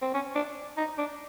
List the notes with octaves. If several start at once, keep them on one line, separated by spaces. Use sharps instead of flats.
C4
C#4
D4
D#4
D4